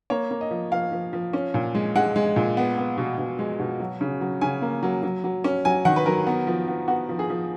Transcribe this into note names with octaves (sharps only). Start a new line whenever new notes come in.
A#3 C#5
A#3
D#5
F3
F3 F5
F3
F3
C#4
A#2
G#3
G#3 F#5
G#3
A#2
B3
B3
B2
B2
G#3
B2
F#3
C#3
F#3
C#3 G#5
A#3
F#3
F#3
F#3
C#4
F#3 G#5
D#3 F#5
B4
F#3 A#4
B3
F3
B3
B3 F#4
F3
G#4
F3